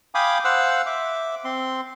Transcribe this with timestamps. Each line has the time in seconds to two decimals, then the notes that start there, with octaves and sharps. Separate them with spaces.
0.15 F5 G5 G#5 B5 D6 D#6
0.45 C5 F5 F#5 E6 F#6
0.86 E5 D6
1.45 C4 C6